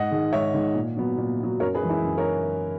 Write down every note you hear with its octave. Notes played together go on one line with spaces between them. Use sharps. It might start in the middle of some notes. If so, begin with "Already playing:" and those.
Already playing: G#2 D#5 F#5
D#3 G#3
G#2 C#5 E5
D#3 G#3
A#2
F#3 B3
A#2
F#3 B3
F#2 A#4 C#5
G#4 B4
E3 G#3
E4 G#4
F#2
A#4 C#5